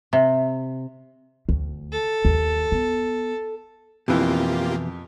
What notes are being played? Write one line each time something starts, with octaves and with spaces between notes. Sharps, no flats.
C3
D2
A4
D#2
B3
F2 B2 E3 A#3 F4 G4